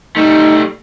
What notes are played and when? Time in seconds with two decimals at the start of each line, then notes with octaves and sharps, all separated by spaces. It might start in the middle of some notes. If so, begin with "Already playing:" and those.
0.16 G3 A3 D#4